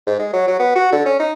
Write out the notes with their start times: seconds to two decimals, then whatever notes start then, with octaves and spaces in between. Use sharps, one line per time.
0.07 G#2
0.19 G#3
0.33 F#3
0.48 F#3
0.59 B3
0.75 F#4
0.92 D3
1.05 C#4
1.19 D#4